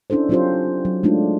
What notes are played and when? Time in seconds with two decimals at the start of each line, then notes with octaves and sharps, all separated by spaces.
0.10 C#4 D4 E4 A4 C5
0.29 F#3 C4 C#4 F4 G4 C5
0.85 F#3
1.03 G#3 A3 D4 D#4 F4